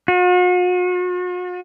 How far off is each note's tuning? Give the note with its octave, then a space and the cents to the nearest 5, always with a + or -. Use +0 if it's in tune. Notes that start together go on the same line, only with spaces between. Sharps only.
F#4 -45